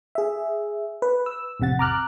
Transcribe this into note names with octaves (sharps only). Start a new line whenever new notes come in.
G#4 E5
B4
E6
A1 F2 C3 F#5 A6
A#5 D6 F6 F#6